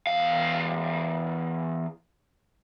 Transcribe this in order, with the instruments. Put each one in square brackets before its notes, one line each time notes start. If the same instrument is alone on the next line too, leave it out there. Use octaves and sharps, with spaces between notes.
[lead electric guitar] E2 F5